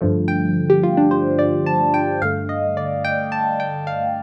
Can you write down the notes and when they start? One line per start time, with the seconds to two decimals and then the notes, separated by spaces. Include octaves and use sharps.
0.01 G2 D3 F3 A3
0.28 G5
0.70 G4
0.83 F4
0.97 D4
1.11 C5
1.39 D5
1.66 A5
1.94 G5
2.22 G2 D3 A3 F5
2.49 D#5
2.77 D5
3.05 G5
3.32 A5
3.60 G5
3.87 F5